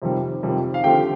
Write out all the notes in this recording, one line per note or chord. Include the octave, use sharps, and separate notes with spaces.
F2 C3 D#3 G3
F2 C3 D#3 G3
F5
D3 F3 A3 C4 G4 G5